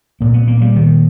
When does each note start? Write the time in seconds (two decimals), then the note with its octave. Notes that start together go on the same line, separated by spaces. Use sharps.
0.20 A#2 A#3
0.34 B3
0.48 A#3
0.62 G3
0.76 D#3